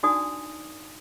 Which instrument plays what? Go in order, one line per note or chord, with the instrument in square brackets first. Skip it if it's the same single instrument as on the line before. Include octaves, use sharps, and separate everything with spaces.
[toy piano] D4 D#4 F#4 D5 G#5 D#6